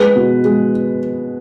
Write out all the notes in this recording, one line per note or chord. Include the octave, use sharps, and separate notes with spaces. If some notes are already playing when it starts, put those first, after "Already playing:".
Already playing: G#3 B4
B2
G#3